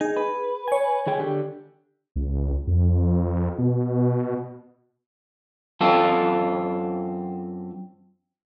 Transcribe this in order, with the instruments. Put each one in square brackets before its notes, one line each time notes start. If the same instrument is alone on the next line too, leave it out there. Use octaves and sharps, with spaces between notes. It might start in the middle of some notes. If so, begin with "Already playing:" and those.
[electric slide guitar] D#4 [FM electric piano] G#4
[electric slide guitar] B4
[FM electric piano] C#5 G#5
[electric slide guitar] D#3 G#4 G5
D3 G4
[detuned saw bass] C#2
F2
B2
[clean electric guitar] F#2 C4 F4 A4